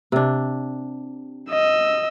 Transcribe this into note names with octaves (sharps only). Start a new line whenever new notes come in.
C3 D4
D#5 E6